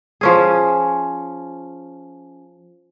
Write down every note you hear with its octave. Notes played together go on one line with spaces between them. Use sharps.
F3 C#4 G#4